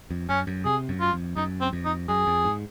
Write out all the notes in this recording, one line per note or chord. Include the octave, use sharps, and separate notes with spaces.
F2
F#2 C#4
F#2
C3 G#4
F#2
F4
F2
F#2 D#4
C4
F2
D#4
F#2 G#4
F2
G#2